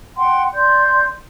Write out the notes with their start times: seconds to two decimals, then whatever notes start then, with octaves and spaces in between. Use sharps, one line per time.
0.16 F#5 G5 C6
0.53 D5 C6 G6